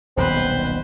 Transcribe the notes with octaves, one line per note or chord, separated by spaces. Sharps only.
D#1 B1 G#2 C4 B4 C5